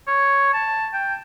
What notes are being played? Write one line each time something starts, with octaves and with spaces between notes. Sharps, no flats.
C#5
A5
G5